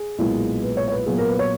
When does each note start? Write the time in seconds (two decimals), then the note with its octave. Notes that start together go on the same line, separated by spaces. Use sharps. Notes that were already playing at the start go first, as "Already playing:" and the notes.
Already playing: G#4
0.18 B1 A#2 G#3 B3 E4
0.63 B4
0.77 C#5
0.88 C#5
0.92 B4
1.06 A#2 F#3 B3 G#4
1.18 A#4
1.29 B4
1.39 C#5